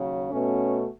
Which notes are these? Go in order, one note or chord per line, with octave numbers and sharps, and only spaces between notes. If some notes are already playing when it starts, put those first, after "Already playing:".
Already playing: D#2 C#3 F#3
B2 A3 C#4